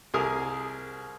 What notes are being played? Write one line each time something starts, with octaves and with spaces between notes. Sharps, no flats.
C2 G#4 A#4 D#6